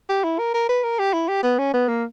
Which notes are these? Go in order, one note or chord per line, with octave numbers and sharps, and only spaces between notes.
G4
E4
A#4
A#4
B4
A#4
G4
E4
G4
B3
C#4
B3
A#3